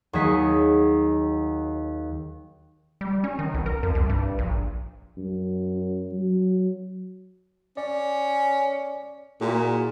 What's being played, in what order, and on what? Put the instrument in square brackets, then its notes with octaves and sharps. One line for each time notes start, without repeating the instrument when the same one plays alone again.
[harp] D#2 F#3 G#4 C#5 D#5 B6
[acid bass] G3
C#4
D#3
B1
A#4
F2
C2
G2
A#1
[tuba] F#2
F#3
[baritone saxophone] C#4 [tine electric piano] D5
[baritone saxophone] A#2 [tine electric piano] E4 F#4 G#4